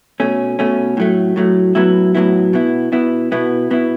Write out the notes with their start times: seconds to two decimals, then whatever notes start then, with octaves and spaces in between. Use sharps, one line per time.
0.20 B2 A3 C#4
0.59 B2 A3 C#4
0.97 A2 F#3 A3
1.36 A2 F#3 A3
1.75 A2 F#3 B3 E4
2.15 A2 F#3 B3 E4
2.53 B2 B3 E4
2.92 B2 B3 E4
3.32 B2 B3 E4
3.71 B2 B3 E4